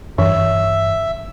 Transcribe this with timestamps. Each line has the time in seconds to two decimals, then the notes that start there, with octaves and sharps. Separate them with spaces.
0.18 G2 E3 E5